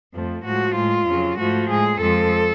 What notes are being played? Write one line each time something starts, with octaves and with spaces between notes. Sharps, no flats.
F2 F3 A3
A2 F3 G#3 F#4
A2 G#3 F4
F2 C#3 F#3
G#2 F3 A3 F#4
A2 G#3 G#4
F2 F3 G#3 A4